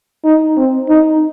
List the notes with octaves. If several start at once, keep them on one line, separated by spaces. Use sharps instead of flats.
D#4
C4
D#4